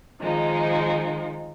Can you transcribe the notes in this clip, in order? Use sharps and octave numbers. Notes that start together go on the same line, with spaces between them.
D#3 F3 G#3 D#4